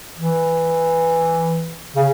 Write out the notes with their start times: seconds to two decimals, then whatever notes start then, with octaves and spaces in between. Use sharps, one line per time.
0.18 E3
1.96 C#3